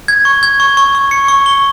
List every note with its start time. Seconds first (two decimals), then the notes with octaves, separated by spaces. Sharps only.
0.08 G#6
0.25 C#6
0.43 G#6
0.60 C#6
0.77 C#6
0.95 C#6
1.11 C#7
1.29 C#6
1.46 G7